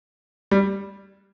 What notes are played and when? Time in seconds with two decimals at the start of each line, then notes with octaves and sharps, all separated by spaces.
0.51 G3